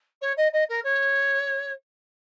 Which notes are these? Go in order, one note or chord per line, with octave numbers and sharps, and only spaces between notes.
C#5
D#5
D#5
A#4
C#5